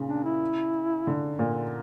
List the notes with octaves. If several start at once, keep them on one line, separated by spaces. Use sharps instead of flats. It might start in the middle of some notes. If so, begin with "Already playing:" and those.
Already playing: A#2 C#3
D4
E4
D3
A#2